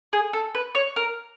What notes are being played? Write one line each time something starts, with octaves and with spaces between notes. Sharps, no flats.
G#4
A4
B4
C#5
A#4